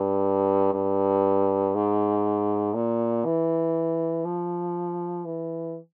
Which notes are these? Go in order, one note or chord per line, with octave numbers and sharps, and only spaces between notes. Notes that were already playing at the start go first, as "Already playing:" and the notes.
Already playing: G2
G2
G#2
A#2
E3
F3
E3